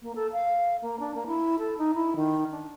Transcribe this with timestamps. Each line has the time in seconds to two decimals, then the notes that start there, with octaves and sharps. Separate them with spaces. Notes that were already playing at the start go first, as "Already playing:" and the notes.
0.01 A#3
0.15 A4
0.33 F5
0.82 A#3
0.99 D4
1.15 A#3
1.27 E4
1.59 A4
1.78 D#4
1.94 E4
2.16 D#3
2.51 D4